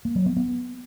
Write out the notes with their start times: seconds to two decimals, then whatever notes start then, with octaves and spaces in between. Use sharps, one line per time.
0.05 A#3
0.15 F#3
0.26 B3
0.36 B3